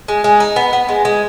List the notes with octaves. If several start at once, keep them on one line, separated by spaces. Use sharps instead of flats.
G#3
G#3
D#4
B3
B3
G#3
G#3